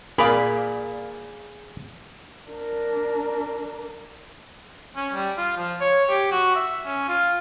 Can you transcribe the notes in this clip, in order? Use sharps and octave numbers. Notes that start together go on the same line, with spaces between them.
A#2 G#4 A#4 D5 F5 B5 D#6
D4 A#4
C#4
G3
F4
F3
C#5
G4
F#4
E5
C#4
F4